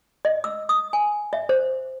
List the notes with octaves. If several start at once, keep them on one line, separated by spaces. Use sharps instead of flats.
D#5
E6
D#6
G#5
E5
C5